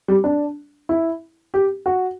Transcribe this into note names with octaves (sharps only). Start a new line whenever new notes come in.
G3
D4
E4
G4
F#4